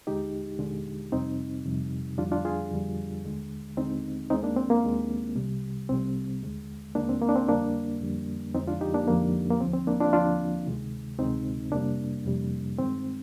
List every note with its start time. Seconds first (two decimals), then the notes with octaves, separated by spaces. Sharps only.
0.07 D#2 D3 G#3 D#4 G4
0.59 D#2 D3 G#3
1.12 F2 C3 G3 C4 D#4
1.65 F2 C3 G3
2.18 F2 D3 G3 D4 F4
2.32 D4 F4
2.45 F4 G#4
2.72 F2 D3 G3
3.24 D#2 D3 G#3
3.77 D#2 D3 G#3 C4 D#4
4.30 D#2 D#3 G#3 C4 D#4
4.43 A#3 D4
4.57 C4
4.70 A#3
4.84 D#2 D#3 G#3
5.36 C2 C3 G3
5.89 C2 C3 G3 C4
6.42 D#2 D3 G#3
6.95 D#2 D3 G#3 A#3 D4
7.09 C4
7.21 A#3
7.29 D4
7.35 C4
7.48 F2 D3 G3 A#3 D4
8.01 F2 D3 G3
8.54 F2 D3 F3 G#3 C4 D#4
8.67 D4 F4
8.81 D#4 G4
8.94 A#3 D4
9.07 F2 D3 F3 G#3 A#3
9.50 A#3
9.60 D#2 D3 F3 C4
9.74 C4
9.87 A#3 D4
10.01 D4 F4
10.13 D#2 D3 F3 D4 F4
10.67 D2 C3 D#3 G#3
11.19 D2 C3 D#3 G#3 C4 D#4
11.72 F2 C3 G3 A#3 D4
12.25 F2 C3 G3
12.78 G2 D#3 G#3 C4